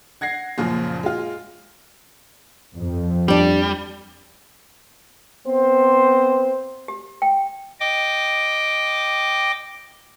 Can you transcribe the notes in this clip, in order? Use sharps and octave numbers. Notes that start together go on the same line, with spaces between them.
F#5 G#6 A#6 C7
F#1 F#2 A#2 C#3 F3
G#3 F4
F2
G3 D4 G4
B3 C4 C5
G4
G5
D#5 G5 D6